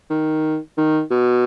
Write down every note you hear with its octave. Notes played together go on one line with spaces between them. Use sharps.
D#3
D#3
B2